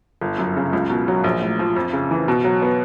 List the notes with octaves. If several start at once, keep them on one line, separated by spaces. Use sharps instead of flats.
G1
F#2
C#3
C#2
B2
F#3
A#1
A2
F3
F2
C#3
E3
B2
F#3
B3